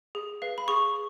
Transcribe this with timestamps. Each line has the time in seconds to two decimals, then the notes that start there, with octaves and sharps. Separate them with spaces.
0.15 G#4
0.42 B4 F5
0.58 B5
0.68 G#4 C#6